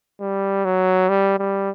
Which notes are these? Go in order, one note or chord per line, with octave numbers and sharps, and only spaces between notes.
G3
F#3
G3
G3